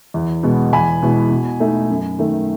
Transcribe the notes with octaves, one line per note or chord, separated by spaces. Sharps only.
E2
B2 G#3 B3
E2 G#5 B5
B2 G#3 B3 E4
B2
A3 D#4
F#2
D#3 A3